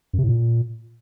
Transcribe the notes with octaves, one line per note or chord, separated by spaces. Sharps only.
F#2
C3
A2
A#2